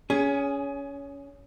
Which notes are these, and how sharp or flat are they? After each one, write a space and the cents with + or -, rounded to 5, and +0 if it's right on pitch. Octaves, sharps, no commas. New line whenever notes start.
C#4 +20 G#4 +0